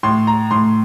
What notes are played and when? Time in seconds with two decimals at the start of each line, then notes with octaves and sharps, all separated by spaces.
0.03 A2 C6
0.27 A#5
0.51 A2 C6